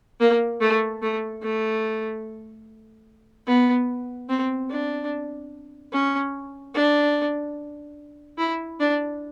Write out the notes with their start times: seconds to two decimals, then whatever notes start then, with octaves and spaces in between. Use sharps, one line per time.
0.20 A#3
0.61 A3
1.02 A3
1.42 A3
3.47 B3
4.29 C4
4.70 D4
5.92 C#4
6.74 D4
8.38 E4
8.79 D4